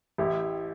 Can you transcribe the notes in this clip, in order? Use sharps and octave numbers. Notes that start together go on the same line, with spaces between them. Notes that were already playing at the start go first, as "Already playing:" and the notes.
A1 E4 G4